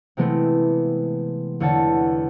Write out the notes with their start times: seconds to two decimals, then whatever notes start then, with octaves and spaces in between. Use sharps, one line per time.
0.17 C3 E3 G#3 A3 B3 C4
1.60 E2 D3 C#5 F#5 A5